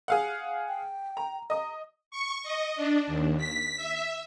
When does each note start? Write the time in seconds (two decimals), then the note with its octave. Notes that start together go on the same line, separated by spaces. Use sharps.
0.08 G#4 F5 F#5
0.68 G5
1.17 A#5
1.50 D#5 A#5 D#6
2.11 C#6
2.43 D#5
2.76 D4
3.07 D#2
3.38 B6
3.77 E5